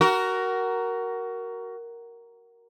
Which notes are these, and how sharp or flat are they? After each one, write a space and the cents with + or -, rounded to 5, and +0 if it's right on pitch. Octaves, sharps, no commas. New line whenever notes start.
F#4 +20 A#4 +0